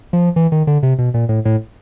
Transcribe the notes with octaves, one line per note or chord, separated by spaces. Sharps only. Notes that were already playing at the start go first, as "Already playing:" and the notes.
F3
E3
D#3
D3
C3
B2
A#2
A2
A2